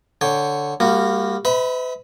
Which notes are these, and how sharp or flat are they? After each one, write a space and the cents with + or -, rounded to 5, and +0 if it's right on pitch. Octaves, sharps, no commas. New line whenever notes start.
D3 +0 C#5 +0 G5 +10
G3 +25 A#3 -20 F#4 +0
B4 +40 E5 -45 B5 -15